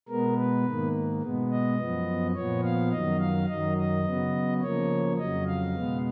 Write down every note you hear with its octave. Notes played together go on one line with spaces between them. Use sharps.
B2 G#3 B3 A#4
B4
G#2 D#3 A#3
B2 G#3 B3
D#5
F#2 F3 B3
A#2 F3 B3 C#5
F5
F#2 D#3 F#3 D#5
F5
F#2 D#3 F#3 D#5
D#5
C#3 F#3 B3
C#3 F3 A#3 C#5
F2 C#3 F#3 D#5
F5
B2 G#3 B3